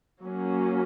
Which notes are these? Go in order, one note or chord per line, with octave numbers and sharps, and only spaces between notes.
F#3 A#3 C#4